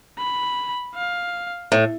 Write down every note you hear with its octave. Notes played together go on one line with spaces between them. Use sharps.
B5
F5
A2